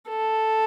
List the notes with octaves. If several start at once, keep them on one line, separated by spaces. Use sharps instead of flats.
A4